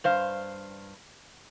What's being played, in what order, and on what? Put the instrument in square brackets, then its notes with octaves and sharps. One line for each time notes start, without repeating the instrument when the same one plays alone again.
[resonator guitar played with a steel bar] G2 C5 F5